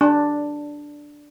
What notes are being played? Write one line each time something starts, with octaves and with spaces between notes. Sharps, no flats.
D4